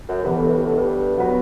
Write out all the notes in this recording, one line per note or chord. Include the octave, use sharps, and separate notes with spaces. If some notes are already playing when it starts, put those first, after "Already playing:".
F#2
G2 E3 B3 F#4 B4
A2
G2
A2
G2
F#3 B3 F#4 B4